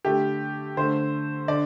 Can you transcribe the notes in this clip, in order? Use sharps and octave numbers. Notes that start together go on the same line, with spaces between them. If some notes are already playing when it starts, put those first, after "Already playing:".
D3 A3 G4
D3 A3 C5
D3 D5